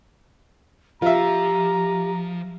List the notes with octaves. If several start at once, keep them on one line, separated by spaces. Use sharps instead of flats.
F3 F4 G4 E5 A#5